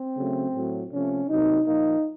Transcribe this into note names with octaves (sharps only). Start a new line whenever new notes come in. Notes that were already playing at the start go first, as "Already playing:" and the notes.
Already playing: C4
C#3 F#3 A3
A2 F#3 A3
C3 F3 A3 C#4
C3 F#3 A#3 D#4
A#2 F3 A#3 D#4